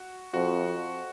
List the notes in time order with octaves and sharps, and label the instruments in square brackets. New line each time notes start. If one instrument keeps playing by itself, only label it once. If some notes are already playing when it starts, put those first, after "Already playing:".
Already playing: [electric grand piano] F#4
[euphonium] F2 [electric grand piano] F#4